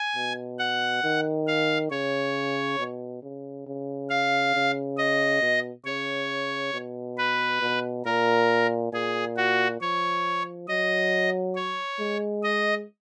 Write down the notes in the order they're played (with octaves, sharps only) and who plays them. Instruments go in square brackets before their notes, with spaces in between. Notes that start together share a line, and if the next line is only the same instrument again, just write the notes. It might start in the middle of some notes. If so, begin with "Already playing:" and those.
Already playing: [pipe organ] G#5
[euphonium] B2
[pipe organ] F#5
[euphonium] D#3
[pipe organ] F5
[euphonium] C#3 [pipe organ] C#5
[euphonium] B2
C#3
C#3
[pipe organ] F5
[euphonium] C#3
[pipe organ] D#5
[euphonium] B2
[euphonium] C#3 [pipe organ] C#5
[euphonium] B2
[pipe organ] B4
[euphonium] B2
[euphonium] A#2 [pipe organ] A#4
[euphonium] A#2 [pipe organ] G#4
[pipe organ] F#4
[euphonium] F3 [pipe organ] C#5
[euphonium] F#3 [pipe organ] D#5
[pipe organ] C#5
[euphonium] G#3
[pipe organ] D#5